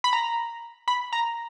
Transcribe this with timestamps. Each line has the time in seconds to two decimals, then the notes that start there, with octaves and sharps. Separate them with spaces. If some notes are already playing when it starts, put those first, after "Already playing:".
0.04 B5
0.13 A#5
0.88 B5
1.13 A#5